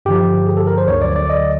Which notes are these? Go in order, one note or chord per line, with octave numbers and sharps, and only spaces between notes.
G2 D3 F3 G4
G#4
A4
A#4
C5
D2 D3 F#3 C#5
D5
D5
D#5